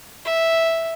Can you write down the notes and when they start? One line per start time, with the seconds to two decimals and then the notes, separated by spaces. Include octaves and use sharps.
0.24 E5